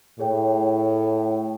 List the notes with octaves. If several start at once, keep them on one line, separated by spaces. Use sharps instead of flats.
A2 G#4 C#5 G5